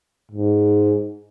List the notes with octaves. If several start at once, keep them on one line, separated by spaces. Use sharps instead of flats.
G#2